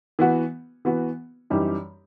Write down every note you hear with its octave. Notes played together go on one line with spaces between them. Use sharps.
E3 B3 F#4
E3 B3 F#4
F#2 E3 G3 D#4 G4